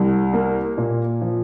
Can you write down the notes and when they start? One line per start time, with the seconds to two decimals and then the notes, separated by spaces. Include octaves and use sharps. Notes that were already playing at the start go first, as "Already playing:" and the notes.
Already playing: C2
0.33 A#3
0.78 A#2
1.21 F3